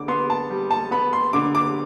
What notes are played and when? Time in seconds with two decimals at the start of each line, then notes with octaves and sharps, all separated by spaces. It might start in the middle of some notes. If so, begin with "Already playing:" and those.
Already playing: D3 D6
0.08 B3 C6
0.30 A5
0.50 G3
0.71 A5
0.91 B3 B5
1.13 C6
1.33 D3 D6
1.55 D6